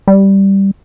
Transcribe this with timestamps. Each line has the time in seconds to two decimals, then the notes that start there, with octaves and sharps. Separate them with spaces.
0.08 G3